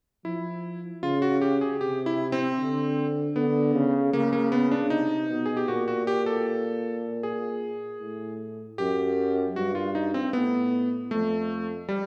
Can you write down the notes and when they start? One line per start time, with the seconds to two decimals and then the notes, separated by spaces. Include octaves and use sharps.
0.25 F3 E4
1.03 C#3 F4
1.22 F#4
1.42 G4
1.61 G#4
1.81 C3 G4
2.06 E4
2.32 C4
2.58 D3
3.36 D3 B3
3.74 C#3
4.13 C#3 A#3
4.33 A#3
4.52 B3
4.71 D4
4.90 C3 D#4
5.29 B2
5.46 G#4
5.57 G4
5.68 A#2 F#4
5.88 F#4
6.07 G4
6.26 A4
7.23 G#4
8.01 A2
8.78 F#2 G4
9.56 G2 F#4
9.75 F4
9.95 D#4
10.14 C4
10.33 A2 B3
11.11 F2 A3
11.89 G3